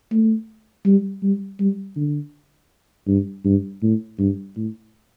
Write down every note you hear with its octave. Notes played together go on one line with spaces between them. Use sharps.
A3
G3
G3
G3
D3
G2
G2
A2
G2
A2